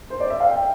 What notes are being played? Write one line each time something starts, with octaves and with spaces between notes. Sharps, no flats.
C5
D5
E5
F5
G5